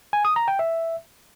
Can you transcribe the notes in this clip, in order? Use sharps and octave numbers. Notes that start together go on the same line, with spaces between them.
G#5
D#6
A#5
G5
E5